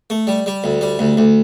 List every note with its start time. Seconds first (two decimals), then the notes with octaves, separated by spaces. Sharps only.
0.10 A3
0.27 G3
0.46 G3
0.64 D2
0.81 G3
0.99 D2
1.17 D2